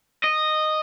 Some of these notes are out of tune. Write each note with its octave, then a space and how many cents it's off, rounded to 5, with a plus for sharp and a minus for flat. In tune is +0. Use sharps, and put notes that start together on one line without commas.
D#5 -10